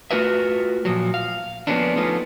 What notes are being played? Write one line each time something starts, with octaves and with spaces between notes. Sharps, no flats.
A3 F4 F#4 A#4 B4 E5
A#2 F3 F#3
F5
F3 G#3 A#3 B3 C#4 D4
F3 A3 B3 C#4 D#4 F4